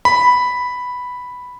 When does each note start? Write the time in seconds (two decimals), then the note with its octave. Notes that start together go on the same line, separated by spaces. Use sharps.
0.05 B5